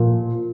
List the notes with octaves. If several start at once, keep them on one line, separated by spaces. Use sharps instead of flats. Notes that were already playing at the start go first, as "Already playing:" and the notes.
Already playing: A#2 F3